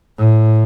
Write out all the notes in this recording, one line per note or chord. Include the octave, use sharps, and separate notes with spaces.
A2